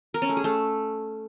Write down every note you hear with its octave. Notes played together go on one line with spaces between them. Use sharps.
A#4
C#4
A3
G#4
A3